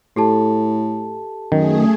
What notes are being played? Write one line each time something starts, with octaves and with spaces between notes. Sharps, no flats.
A2 G4 A4 A5
F#2 D#3 A3 G#4